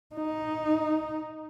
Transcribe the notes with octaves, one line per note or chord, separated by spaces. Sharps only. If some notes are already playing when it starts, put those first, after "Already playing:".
D#4